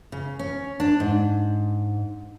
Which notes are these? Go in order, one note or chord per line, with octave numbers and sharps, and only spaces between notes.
C#3
C#4
D4
G#2